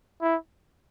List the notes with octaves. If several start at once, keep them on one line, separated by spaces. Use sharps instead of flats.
E4